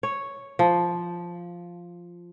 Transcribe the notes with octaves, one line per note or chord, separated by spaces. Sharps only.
C#5
F3